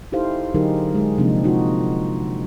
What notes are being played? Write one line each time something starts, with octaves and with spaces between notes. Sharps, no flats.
D#4 E4 G4 A4 C5 F5
D3 F#3 D#4 G4 G#4 A#4
G#3 G#4
C3 F3 A#3 C4 D4 D#4
D#4 F4 F#4